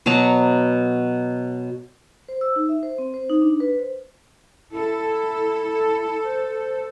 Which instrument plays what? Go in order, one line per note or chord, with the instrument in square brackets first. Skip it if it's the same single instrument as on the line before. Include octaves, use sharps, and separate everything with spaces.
[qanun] B2 F#3 A5 A#5
[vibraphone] C5
E6
D#4
E5
C5
C4
C5
D#4
D4
B4
C5
[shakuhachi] E4 [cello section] A4
[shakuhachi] C5